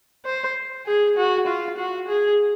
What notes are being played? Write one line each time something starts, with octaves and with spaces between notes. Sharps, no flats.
C5
G#4
F#4
F4
F#4
G#4